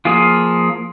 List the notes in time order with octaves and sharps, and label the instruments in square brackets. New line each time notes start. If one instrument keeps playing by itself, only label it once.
[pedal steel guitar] F3 A#3 F4 G#4